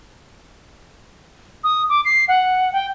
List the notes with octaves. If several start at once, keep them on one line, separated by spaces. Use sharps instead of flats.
D#6
D6
C7
F#5
G5